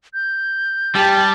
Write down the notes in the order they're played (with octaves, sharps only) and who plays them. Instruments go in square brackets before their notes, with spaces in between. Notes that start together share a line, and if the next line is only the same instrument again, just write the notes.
[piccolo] G6
[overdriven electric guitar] G3 [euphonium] G4 [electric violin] A5